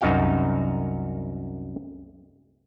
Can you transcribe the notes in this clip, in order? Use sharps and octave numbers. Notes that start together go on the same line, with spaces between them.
C2 F#2 D#4 F#4 F5 G5